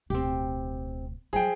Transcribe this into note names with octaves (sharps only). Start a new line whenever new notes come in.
D1 B2 C4 G4
F3 F#3 F4 G#4 G5